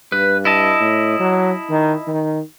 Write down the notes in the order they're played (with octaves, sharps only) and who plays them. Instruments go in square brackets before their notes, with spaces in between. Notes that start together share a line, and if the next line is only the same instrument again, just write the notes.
[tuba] G2 [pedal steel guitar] B4
[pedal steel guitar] E4 D#5 A5
[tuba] A2
F#3
D#3
D#3